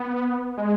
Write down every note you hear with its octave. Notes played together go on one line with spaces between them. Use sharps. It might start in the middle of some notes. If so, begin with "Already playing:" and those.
Already playing: B3
G#3